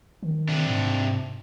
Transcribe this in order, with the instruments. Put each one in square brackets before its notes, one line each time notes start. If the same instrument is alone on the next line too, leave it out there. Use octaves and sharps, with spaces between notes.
[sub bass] D#3
[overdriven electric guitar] C3 D4
[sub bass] G#2